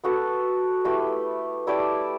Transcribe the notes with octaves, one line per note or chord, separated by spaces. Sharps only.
B3 F#4 A4
A3 E4 G4 B4
A3 E4 G4 D5